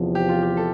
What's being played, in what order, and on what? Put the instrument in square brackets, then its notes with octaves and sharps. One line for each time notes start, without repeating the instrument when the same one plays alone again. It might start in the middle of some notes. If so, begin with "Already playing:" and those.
Already playing: [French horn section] E2 C3 F3
[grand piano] G4
F4
G4
A4